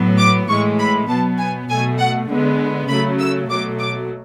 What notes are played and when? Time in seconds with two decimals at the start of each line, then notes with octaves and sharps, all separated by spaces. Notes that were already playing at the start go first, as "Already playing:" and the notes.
Already playing: A2 F#3 B3
0.18 D6
0.48 A2 E3 G#3 C#6
0.79 B5
1.08 B2 F#3 B3 A5
1.38 G#5
1.69 B2 A3 G#5
1.99 F#5
2.29 D3 G#3 B3
2.88 C#3 F#3 A3 B5
3.19 E6
3.49 B2 F#3 A3 D6
3.79 D6